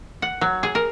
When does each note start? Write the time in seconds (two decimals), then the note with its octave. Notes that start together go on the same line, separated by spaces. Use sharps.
0.22 F#5
0.41 F#3
0.63 G#4
0.75 A#4